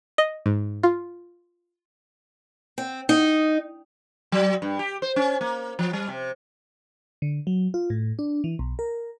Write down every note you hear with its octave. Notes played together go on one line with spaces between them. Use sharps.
D#5
G#2
F4
C4
D#4
F#3
G2
G4
C5
C#4
A#3
F3
G3
C3
D3
F#3
F4
A2
D4
E3
B1
A#4